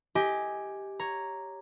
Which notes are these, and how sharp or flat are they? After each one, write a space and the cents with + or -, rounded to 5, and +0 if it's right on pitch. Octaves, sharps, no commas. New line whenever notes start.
G4 +0 D#5 +25 G#5 +0
C#5 +0 A#5 +0